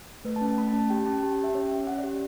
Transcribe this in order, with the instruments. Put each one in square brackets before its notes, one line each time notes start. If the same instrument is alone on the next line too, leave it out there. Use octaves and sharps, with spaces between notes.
[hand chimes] A3 B4
A5
C#4
A5
A3 B5
A5
C#4
A5
G4 G5
C#4 A5
G4 A5
G5
G4
E5
C#4 C#5
C#4 E5
C#4 F#5
D5
G4